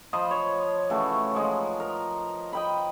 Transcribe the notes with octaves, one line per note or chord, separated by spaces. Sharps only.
F3 C5 D#5 B5
C#5
C#3 E3 A3 F#4
F3 G#3 D#4
A#4
D#5 G5 B5